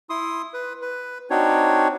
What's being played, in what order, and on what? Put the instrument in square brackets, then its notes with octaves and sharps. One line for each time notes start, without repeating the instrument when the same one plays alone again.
[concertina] E4 C6 D#6
B4
B4
C4 D4 D#4 F#4 C#5